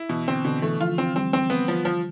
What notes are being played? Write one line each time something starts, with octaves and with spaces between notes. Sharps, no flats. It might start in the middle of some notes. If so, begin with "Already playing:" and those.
Already playing: E4
B2 E3
D3 C4
B2 D3
E3 A3
F3 F4
C4
G3 C4
C4
B3
F3
F3